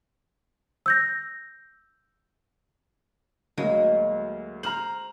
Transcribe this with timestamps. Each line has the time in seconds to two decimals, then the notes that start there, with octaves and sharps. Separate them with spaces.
0.86 E6 G6 A#6
3.58 D2 F#3 G#3 A#3
4.63 C5 A#5 F6 F#7